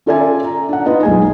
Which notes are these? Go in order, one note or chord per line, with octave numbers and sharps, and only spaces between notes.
C#4 F4 A4 D5 E5 G#5
A#5
D4 F#5
D#4 F4 B4 D#5
B1 G#3 G#4 G#5